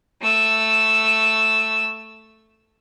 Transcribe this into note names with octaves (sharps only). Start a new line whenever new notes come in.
A3 E6